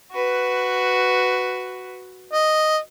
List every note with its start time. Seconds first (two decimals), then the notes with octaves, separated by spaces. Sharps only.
0.12 F#4 B4
2.33 D#5